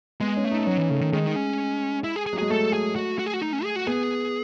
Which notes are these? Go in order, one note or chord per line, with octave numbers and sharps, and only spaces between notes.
G#3 B3
C#4
A3
D#4
F#3 C#4
E3
C#3 A3
D#3
D#3 G#3
D#4
C#4
E4
G#4
G#4
F#3
G#3 G#4
A3 A4
G#4
F#4
F#4
G#4
F#4
D#4
C#4
G#4
F#4
B3 G#4